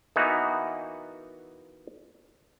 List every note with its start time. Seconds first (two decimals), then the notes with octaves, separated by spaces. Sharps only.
0.16 E3 A#3 B3 D#4 F#4